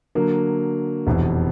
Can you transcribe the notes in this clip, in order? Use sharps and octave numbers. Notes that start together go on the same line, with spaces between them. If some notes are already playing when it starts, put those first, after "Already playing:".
D3 F#3 A#3
F1 E2 B2